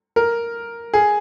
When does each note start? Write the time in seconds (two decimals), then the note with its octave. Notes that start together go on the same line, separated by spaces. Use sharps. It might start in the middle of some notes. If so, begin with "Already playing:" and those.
0.16 A#4
0.94 G#4